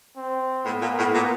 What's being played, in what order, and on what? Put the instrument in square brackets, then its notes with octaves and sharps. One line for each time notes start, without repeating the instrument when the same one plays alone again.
[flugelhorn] C4
[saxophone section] A2 [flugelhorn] B3
[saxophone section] A#2
A2
A#2